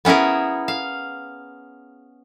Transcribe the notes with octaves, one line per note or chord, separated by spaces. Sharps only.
B3 C#4 E4 G#4 A#4
F5